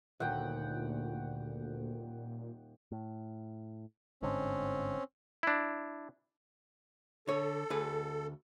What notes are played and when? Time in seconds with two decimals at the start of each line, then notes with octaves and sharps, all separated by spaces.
0.20 D#1 D2 A#2 F#5 G5
2.92 A2
4.22 G1 G#2 D3 C4 C#4
5.43 D4 E4
7.27 D3 A4 C#5
7.70 D2 G#4 B4